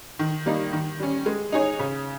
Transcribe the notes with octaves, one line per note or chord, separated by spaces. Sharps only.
D#3
G3 A#3 D#4
D#3
G3 C#4
G#3
D#4 G#4 C#5
C#3